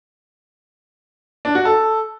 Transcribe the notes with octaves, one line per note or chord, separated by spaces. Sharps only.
D4
F#4
A4